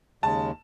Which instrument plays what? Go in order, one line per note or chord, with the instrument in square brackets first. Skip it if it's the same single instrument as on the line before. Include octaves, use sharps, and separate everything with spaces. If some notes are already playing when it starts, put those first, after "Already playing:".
[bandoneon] D#2 C#3 G#3 [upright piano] A5